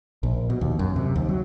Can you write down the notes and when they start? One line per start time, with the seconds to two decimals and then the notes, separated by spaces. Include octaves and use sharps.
0.23 A#1
0.50 B2
0.61 D#2
0.79 F#2
0.96 C3
1.16 D#2
1.29 F#3